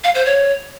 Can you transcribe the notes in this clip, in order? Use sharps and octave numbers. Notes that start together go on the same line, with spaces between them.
F5
C5
C#5